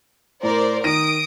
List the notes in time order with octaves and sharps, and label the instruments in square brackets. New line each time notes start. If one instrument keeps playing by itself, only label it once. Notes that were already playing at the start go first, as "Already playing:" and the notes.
[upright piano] A2 [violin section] A#4 C5 D5
[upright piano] D#3 A#6 D#7 [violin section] D#6 D7